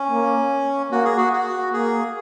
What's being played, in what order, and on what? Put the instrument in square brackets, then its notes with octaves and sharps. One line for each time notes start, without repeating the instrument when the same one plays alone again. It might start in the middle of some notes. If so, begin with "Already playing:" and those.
Already playing: [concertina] C#4
[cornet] A#3
[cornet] A#3 [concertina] F#4
[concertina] G#4
F#4
F#4
[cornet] A#3 [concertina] G#4